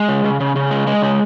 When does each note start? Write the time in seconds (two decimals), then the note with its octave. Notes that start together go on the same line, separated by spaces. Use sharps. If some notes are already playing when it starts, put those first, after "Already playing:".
Already playing: G#3
0.09 C#3
0.24 C#3
0.41 C#3
0.56 C#3
0.71 G#3
0.87 G#3
1.02 C#3